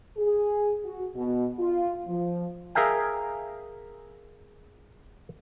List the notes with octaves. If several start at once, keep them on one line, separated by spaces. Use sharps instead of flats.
G#4
F#4
B2
F4
F3
G#4 A#4 E5 F5 G5